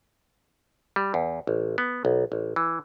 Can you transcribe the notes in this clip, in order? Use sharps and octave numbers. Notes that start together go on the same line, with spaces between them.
G3
E2
A1
B3
B1
A1
E3